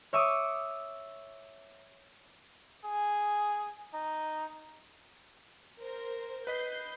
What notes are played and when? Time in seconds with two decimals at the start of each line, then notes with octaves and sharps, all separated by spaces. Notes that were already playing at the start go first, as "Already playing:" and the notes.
0.13 C#5 E5 D6 D#6
2.85 G#4
3.94 D#4
5.80 A#4 C5
6.47 B4 D#5 G6 B6 C7